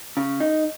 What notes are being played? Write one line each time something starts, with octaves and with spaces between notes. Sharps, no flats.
C#3
D#4